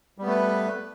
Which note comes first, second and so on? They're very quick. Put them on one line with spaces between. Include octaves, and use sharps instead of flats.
G3 B3 A3 B4